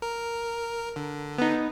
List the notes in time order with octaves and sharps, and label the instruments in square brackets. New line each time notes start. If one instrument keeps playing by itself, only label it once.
[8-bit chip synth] A#4
D3
[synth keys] B3 D#4